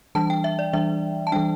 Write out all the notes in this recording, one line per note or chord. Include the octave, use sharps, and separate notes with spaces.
E3 G3 D4 A5
G5
E5
D5
E3 G3 D4 E5
A5
E3 G3 D4 G5